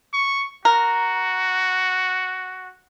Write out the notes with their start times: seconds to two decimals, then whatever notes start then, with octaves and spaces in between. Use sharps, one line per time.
0.13 C#6
0.65 F#4 A#4